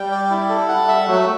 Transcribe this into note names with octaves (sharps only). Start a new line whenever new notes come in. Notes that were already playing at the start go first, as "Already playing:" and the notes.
Already playing: G3 G5
D5
E4
A4
F#5
G3 E5
F#3 A3 F#4